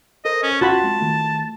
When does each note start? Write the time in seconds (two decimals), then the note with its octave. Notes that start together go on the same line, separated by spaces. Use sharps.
0.25 A4 A#4 C5 D#5
0.43 C#4
0.61 D2 C#4 F4 F#4 A5 B5 F#6
0.84 G#3 C4
1.01 D#3 A3